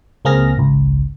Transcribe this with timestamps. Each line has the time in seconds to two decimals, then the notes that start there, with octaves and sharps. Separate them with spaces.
0.25 C#2 A#3 C4 G#4 F6 A#6
0.57 G#1 C#2